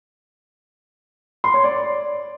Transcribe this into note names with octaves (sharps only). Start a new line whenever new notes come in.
C6
C#5
D5